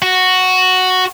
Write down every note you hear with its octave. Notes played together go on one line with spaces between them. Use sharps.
F#4